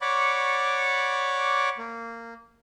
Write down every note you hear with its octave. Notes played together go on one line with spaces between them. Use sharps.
C#5 D5 F#5 B5 C#6 D6
A#3